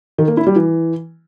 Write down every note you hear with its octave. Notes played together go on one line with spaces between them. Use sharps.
D#3
A#3
E4
G3
E3